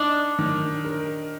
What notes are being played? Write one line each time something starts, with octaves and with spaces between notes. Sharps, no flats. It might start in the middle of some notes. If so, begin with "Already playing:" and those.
Already playing: D4 D#4
D#3
A#4